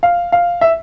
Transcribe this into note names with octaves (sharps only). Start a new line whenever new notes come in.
F5
F5
E5